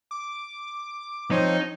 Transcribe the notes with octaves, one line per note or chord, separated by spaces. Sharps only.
D6
F3 C4 D#4 C5 C#5